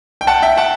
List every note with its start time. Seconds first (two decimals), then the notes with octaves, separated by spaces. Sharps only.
0.21 G5
0.27 F#5 A5
0.42 E5 G5
0.57 F#5 A5